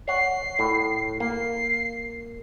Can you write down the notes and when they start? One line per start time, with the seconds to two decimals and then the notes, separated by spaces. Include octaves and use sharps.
0.08 C#5 F#5 C7
0.59 A2
1.20 A#3 C7